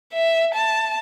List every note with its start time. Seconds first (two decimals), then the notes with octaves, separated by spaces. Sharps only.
0.13 E5
0.55 A5